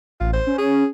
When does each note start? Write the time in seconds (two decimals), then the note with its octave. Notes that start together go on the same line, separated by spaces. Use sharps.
0.20 A1 F4
0.33 C5
0.47 C#4
0.58 G#4